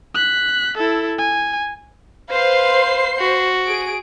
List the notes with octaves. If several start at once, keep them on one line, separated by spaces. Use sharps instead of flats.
F#6 B6
E4 A4
G#5
B4 C5 F5 C6 C7
F#4
G#4 D7